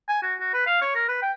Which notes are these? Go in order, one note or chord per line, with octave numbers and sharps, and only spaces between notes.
G#5
F#4
F#4
B4
F5
C#5
A#4
B4
G5